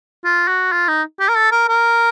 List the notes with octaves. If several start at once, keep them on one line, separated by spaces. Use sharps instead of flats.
F4
F#4
F4
D#4
G4
A#4
A4
A#4
A#4